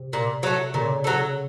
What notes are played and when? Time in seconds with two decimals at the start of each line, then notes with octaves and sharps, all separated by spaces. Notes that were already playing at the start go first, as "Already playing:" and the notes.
Already playing: C3
0.13 A#2
0.43 F#3 A3
0.74 A#2 C#3
1.04 F#3 A3